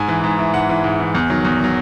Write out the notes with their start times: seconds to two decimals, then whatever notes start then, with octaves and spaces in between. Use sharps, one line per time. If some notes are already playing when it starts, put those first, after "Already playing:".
Already playing: G#2 G#5
0.08 E3
0.24 G#2
0.38 E3
0.54 G#2 F#5
0.69 E3
0.84 G#2
1.00 E3
1.15 E2
1.30 D#3 F#3
1.44 E2
1.60 D#3 F#3